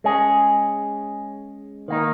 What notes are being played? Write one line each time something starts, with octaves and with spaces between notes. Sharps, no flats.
G#3 C#4 G#4
D#3 A#3 D#4